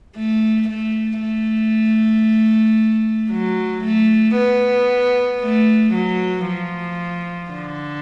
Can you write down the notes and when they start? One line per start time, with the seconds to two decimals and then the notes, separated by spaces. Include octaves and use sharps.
0.16 A3
0.68 A3
1.21 A3
3.32 F#3
3.84 A3
4.37 B3
5.42 A3
5.94 F#3
6.47 F3
7.52 D3